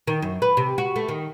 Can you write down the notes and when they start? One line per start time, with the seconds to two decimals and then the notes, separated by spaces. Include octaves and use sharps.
0.07 D#3
0.22 F#2
0.42 B4
0.57 C3
0.78 F#4
0.96 A3
1.09 D#3